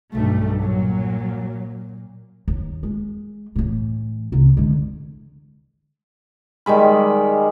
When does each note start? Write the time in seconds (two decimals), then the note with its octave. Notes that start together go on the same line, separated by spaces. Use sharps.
0.13 B1 G2 A3
0.60 A#2 F#3
2.48 D#2
2.83 G#3
3.56 A2 E3
4.32 C#2 C3
4.57 D3 G#3
6.66 D#3 G3 G#3 B5